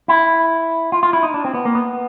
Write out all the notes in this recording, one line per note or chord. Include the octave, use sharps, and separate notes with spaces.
E4
F4
F4
E4
D#4
D4
C4
B3
A#3
B3